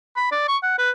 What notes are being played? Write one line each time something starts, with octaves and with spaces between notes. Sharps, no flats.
B5
D5
C#6
F#5
B4